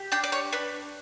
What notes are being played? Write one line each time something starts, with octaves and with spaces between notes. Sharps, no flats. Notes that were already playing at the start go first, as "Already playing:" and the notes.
Already playing: G4
D4 G5
D5
C#5
D4 B4